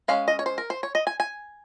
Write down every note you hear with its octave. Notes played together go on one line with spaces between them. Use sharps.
G#3 C#4 F5
D#5
C#5
C5
A#4
C5
C#5
D#5
G#5
G#5